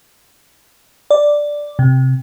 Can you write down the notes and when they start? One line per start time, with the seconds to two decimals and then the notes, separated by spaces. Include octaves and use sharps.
1.11 D5
1.79 C3